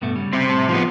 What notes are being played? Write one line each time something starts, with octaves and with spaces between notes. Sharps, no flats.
G2 B2 A3
C#3 G3
C3 C4
A2 A5
F3 B3